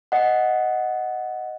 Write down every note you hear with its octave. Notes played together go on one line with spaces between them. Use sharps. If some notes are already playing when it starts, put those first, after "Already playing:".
D#5 F#5